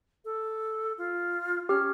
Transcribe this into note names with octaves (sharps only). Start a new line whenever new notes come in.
A4
F4
C#4 G4 F6